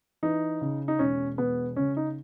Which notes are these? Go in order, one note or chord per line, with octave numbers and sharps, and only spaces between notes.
E3 D#4
C#3
D#4
E1 C#4
E1 B3
C#3 C#4
D#4